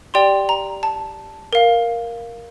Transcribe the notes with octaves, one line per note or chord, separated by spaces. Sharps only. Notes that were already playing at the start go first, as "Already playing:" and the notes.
G4 D5 G5 C6
A#5
A5
A#4 F5